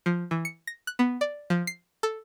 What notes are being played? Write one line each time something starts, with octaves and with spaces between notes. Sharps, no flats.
F3
E3
C#7
A#6
F#6
B3
D5
F3
C7
A4